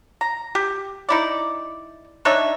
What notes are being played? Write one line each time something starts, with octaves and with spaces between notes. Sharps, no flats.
A#5
G4
D#4 E4 D5
D4 D#4 C#5 E5